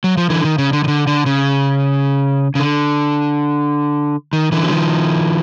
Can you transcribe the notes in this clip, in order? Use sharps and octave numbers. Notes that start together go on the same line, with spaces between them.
F#3
F3
D3 E3
D#3
C#3
D3
D#3
D3
D3
C#3
C#3
D3
D#3
D3 E3
F#3
D#3 F3